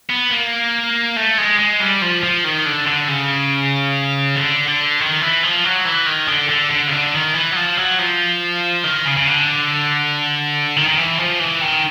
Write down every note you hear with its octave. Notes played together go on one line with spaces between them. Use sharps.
B3
A#3
A3
G#3
G#3
G3
F3
F3
D#3
D3
D3
C#3
D3
D3
D#3
E3
F3
F#3
E3
D#3
D3
D3
D3
C#3
D3
D#3
E3
F#3
F3
F#3
F3
D#3
C#3
C#3
D3
D#3
D#3
E3
F3
E3
D#3